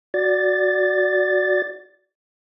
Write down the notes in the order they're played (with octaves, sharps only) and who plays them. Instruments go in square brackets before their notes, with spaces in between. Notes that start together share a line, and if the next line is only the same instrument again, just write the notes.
[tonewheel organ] F#4 D5 A6